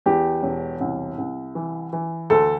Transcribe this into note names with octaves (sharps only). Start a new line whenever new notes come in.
E2 G4
E1
C2
C2
E3
E3
D2 A4